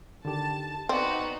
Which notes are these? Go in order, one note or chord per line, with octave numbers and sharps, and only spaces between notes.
D3 D#3 G4 A5
B3 C4 D#4 F#4 D5